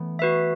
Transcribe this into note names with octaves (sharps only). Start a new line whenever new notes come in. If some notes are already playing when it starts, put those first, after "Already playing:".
Already playing: E3 A3 B3
F#4 B4 E5